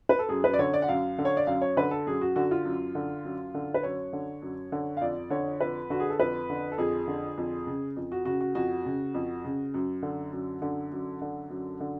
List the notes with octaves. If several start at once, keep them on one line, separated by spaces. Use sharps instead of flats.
B4
A4
F#2 G#4
B4
D5
D3 C#5
D5
F#5
F#2 F5
D3
C#5
D5
F#2 F5
C#5
D3 B4
A4
F#2 G#4
F#4
D3 F#4
F4
F#2
D3
F#2
D3
B4
F#2 C#5
D3
F#2
D3
F5
F2 D5
D3 C#5
F2 B4
D3 F#4
G#4
A4
F2 B4
D3
A4
F2 G#4
D3
F2
C#3
F2
F#4
C#3 F#4
F#4
F2 F#4
C#3
F2
C#3
F#2
D3
F#2
D3
F#2
D3
F#2
D3